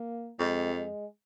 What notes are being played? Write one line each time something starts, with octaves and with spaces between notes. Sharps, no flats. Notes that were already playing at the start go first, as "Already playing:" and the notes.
Already playing: A#3
F2 G#3
G#3